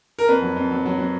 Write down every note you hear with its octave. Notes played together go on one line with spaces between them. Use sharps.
A#4
F2 B4
F#3
F2
F#3
F#3
F#3